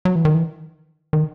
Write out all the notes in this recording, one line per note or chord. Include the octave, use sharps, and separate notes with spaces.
F#3
E3
D#3
E3
D#3